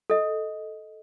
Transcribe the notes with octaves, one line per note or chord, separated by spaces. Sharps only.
A4 D#5